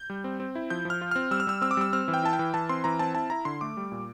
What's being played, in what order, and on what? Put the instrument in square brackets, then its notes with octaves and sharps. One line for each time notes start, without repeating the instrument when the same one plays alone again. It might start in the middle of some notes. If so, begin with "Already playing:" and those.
Already playing: [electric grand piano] G6
G3
C4
C4
E4
F3 G6
F3 F6
F4
C4 F6
G3 E6
F6
G3 E6
C4 E6
D6
G3 E6
C4 F6
E3
G5
E4 A5
G5
E3
E3 A5
C4 C6
E3 A#5
C4 A5
E4 A5
E4 A#5
D3 C6
A3 D6
G3
A#2